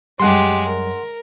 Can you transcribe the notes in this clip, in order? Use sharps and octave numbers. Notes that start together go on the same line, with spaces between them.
F#2 G3 G#3 G4 F#5 C6
A#4